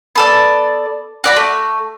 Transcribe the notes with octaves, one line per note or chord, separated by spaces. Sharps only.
B3 A4 D5
F#4 D5 B5
A3